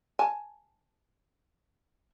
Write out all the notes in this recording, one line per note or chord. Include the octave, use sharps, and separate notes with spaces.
G#5 A5